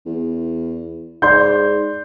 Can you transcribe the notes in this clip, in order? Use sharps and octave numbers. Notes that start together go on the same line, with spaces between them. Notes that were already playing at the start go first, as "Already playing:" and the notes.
E2
G#2 D5 C6 G6